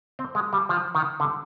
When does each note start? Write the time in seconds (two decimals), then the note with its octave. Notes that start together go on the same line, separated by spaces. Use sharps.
0.19 C4
0.35 G#3
0.53 G3
0.69 F3
0.95 D#3
1.20 D3